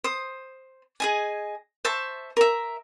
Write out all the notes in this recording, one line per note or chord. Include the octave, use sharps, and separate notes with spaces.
C5 D#6
G#4 D#5 G#5
C5 E5 A5 C#6
A#4 E5